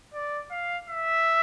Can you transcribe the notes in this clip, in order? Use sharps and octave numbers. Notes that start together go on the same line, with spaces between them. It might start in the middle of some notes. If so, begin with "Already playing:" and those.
D5
F5
E5